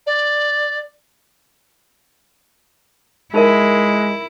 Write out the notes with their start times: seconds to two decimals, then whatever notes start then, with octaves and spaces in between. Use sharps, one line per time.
0.07 D5
3.34 G#3 D#4 E4 A#4 E5